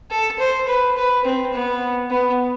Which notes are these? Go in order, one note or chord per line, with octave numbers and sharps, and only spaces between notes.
A4
C5
B4
B4
C4
B3
B3